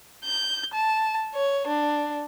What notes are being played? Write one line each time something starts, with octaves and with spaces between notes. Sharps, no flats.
G6
A5
C#5
D4